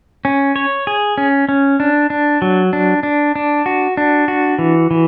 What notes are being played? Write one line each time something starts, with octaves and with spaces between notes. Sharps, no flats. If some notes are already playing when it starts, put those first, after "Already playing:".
C#4
C#5
G#4
C#4
C#4
D4
D4
F#3
D4
D4
D4
F#4
D4
F#4
E3
E3